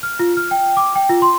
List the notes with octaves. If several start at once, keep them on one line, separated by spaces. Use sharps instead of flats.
F6
F4
F6
G5
D6
G5
F4
C6